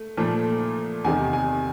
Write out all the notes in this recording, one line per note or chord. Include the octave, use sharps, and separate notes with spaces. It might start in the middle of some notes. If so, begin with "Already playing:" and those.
Already playing: A3
A#2 F3 A3
E2 C3 D#3 G#5
G#5